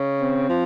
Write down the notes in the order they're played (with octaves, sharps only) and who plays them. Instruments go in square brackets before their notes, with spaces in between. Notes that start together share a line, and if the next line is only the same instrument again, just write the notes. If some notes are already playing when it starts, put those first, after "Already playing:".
Already playing: [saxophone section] C#3
C4
F3